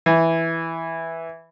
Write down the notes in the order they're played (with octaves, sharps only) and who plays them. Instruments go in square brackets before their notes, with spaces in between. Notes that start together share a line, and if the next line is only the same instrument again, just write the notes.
[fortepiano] E3